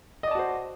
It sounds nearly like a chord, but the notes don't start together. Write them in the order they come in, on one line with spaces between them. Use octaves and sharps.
D#5 D5 A5 F#4 C5